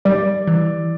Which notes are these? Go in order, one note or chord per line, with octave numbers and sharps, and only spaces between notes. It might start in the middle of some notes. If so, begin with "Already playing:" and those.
G3 D5
E3